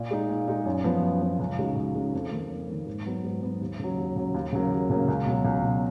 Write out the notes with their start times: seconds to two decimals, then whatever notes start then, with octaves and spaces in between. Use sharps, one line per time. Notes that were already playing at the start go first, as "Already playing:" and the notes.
Already playing: A#2
0.11 G#3 D#4
0.29 A#2
0.48 G#3 D#4
0.65 F#2
0.84 F3 B3
1.02 F#2
1.21 F3 B3
1.39 C#2
1.58 C#3 G#3 D#4 F#4
1.76 C#2
1.95 C#3 G#3 D#4 F#4
2.13 F2
2.32 D#3 A#3
2.50 F2
2.68 D#3 A#3
2.86 G#2
3.06 F#3 B3
3.24 G#2
3.42 F#3 B3
3.61 D#2
3.79 C#3 F#3
3.97 D#2
4.16 C#3 F#3
4.34 D#2
4.52 C#3 F#3 A#3
4.72 D#2
4.90 C#3 F#3 A#3
5.08 C#2
5.26 B2 F#3
5.45 C#2
5.63 B2 F#3